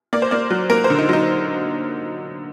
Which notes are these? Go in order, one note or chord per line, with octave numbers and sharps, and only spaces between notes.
A#3 D5
C5
A#3 D5
F#3
A#3 A#4
C5
D3
D#4
F#3 D#4